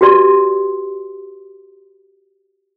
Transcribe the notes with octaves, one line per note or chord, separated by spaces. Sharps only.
F#4 G4 B4 D5 C6